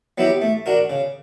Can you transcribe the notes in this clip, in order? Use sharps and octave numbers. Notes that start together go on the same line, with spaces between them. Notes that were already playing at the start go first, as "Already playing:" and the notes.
F#3 B3 E4 G4
A3
D4 F#4 A#4
C#3